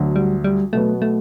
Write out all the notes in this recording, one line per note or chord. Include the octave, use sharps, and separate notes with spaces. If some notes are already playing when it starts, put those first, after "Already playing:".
Already playing: D2 D3 F#3
G3
G3
B2 F#3 A3 B3
A3